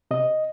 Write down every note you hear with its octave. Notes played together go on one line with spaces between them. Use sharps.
C3 D#5